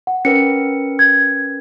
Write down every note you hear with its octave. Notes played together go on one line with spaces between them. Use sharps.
F#5
C#4 A#4 B4 C#7
G#6